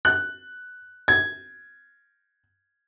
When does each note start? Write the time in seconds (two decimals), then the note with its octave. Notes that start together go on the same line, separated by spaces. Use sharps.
0.05 F#6
1.08 G#6